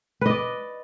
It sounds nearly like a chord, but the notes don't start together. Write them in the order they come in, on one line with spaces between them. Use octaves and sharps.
B4 D#5 D5